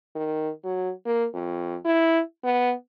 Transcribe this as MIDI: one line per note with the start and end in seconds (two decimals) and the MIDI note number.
0.15 0.50 51
0.64 0.91 54
1.05 1.26 58
1.34 1.76 41
1.85 2.20 64
2.44 2.73 59